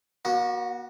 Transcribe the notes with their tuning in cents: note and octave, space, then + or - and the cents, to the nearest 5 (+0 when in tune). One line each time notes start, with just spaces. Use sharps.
A#3 +45 F#4 +0